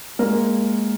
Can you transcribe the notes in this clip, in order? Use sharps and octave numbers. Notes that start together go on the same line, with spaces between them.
G#3 A#3 A#4